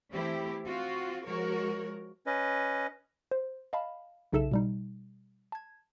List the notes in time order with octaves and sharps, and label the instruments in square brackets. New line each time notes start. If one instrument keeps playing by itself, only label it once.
[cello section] E3 A3 C4 E4 G4
C4 F4 F#4
F3 G#3 F#4 A#4 C#5
[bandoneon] C#4 B4 D#5
[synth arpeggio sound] C5
D#5 F5 A5 B5
B1 C#3 D#4 A4 E5 E7
B2 G3 D#4
A5 G#6